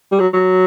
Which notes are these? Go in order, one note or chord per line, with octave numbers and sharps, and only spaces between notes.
G3
F#3
F#3